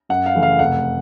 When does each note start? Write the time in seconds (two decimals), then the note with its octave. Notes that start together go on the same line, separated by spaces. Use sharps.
0.09 F#2 F#5
0.26 F5
0.35 C#3 E3 A3
0.43 F5
0.59 F1 F#5